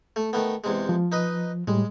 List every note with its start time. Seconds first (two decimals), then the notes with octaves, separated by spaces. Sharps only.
0.16 A3
0.33 D#3 A3 B3
0.64 E2 C3 G#3
0.89 F3
1.12 D#4 B4 D#5
1.68 A2 G3 G#3